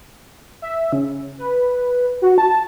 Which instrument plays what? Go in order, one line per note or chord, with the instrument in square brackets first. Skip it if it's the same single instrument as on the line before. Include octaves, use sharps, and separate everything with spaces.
[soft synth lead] E5
C#3
B4
F#4
A5